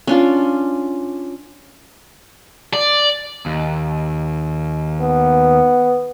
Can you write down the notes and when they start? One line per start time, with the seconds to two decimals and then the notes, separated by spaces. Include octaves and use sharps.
0.07 C#4 D4 F4
2.73 D5
3.46 D#2
5.01 B3